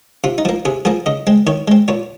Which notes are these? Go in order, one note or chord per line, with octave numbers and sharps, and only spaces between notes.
C3 F4
D#4
F3 A#3
C3 G#4
F3 A#3 G#4
C#3 D#5
G#3 C4
D#3 C#5
G#3 C4
A#2 C#5